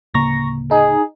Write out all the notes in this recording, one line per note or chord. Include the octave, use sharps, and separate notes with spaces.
D1 C#3 A#3 A#5 C#6 A#6
D#4 G#4